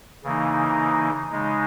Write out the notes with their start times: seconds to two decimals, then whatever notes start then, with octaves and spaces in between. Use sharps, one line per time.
0.24 C#3 E3 A#3 D#4
1.32 C#3 G#3 D#4